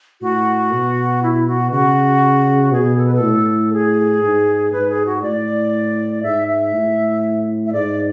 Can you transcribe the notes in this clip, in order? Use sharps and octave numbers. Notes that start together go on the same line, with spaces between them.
A2 F#4
B2
E4
F#4
C#3 F#4
B2 G#4
A4
B4
A4
A2
G#4
G#2
G#2 B4
G#4
F#4
A2 D5
G#2 E5
E5
A2
E5
G#2 D5